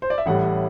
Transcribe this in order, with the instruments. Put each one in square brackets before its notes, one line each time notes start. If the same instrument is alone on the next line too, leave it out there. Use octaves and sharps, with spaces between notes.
[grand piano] C5
D5
E5
A1 A2 G3 F#5